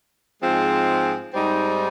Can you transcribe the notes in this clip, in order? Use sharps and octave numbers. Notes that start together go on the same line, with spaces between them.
G#2 F3 G#3 C4
G#2 G3 C4 D#4